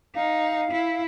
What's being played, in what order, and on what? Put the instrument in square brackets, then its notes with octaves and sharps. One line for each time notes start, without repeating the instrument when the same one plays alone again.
[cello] D#4 [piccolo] F5
[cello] E4